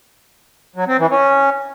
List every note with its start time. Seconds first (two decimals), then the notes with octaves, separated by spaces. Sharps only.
0.76 F#3
0.87 C4
0.99 E3
1.10 C#4